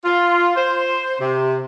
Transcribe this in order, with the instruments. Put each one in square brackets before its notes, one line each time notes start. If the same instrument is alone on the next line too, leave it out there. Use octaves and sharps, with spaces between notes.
[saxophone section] F4
C5
C3